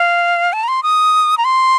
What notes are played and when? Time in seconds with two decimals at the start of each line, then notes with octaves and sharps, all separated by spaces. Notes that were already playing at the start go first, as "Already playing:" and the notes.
Already playing: F5
0.53 A5
0.63 A#5
0.68 C6
0.83 D#6
1.37 A#5
1.44 C6